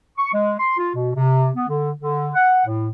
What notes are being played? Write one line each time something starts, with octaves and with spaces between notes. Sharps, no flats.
C#6
G#3
C6
F4
B2
C3
B3
D3
D3
F#5
A2